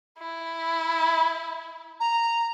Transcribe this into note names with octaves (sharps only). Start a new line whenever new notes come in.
E4
A#5